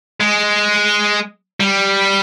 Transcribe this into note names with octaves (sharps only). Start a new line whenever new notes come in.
G#3
G3